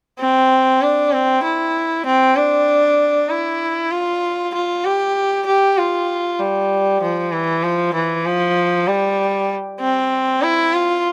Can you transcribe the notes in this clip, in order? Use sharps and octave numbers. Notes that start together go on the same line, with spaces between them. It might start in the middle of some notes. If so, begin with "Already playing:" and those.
C4
D4
C4
E4
C4
D4
E4
F4
F4
G4
G4
F4
G3
F3
E3
F3
E3
F3
G3
C4
E4
F4